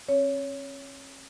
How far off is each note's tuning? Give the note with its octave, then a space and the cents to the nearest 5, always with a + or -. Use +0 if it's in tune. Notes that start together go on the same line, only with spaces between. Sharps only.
C#4 -45 C#5 +15